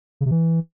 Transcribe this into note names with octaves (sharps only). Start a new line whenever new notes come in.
C#3
C3
E3